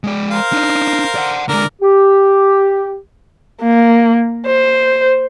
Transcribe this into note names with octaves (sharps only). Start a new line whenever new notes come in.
G#3 D5
A#4 C5 F5
D4 D#4
D5 F#5
D3 G#3 A#4 D5
G4
A#3
C5